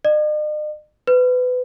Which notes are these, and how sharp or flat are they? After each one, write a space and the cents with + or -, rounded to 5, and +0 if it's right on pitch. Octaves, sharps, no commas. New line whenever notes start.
D#5 -45
B4 +25